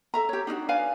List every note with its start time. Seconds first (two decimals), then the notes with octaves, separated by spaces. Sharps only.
0.14 A4 E5 A#5
0.29 G4 C#5
0.47 D4 D#4 F4 F#4
0.68 B4 D5 F5 G#5